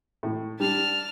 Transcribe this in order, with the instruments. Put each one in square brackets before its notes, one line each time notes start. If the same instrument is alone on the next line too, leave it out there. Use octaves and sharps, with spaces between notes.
[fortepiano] A2
[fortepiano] G3 D4 [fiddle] A5 F6